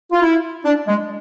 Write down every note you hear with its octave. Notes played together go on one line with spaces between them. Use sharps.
F4
E4
D4
G#3